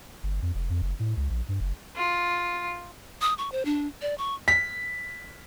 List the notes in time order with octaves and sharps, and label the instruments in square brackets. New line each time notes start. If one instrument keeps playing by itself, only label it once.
[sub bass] G1
F2
F1
F2
F#1
A2
C#2
A#1
G2
F#1
[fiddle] F4
[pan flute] D#6
C#6
C5
D4
D5
C#6
[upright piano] B6